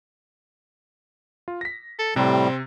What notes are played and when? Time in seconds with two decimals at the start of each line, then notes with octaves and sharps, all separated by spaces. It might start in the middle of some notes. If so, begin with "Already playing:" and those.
1.48 F4
1.61 A#6 B6
1.99 A4
2.16 A2 C3 G3 C4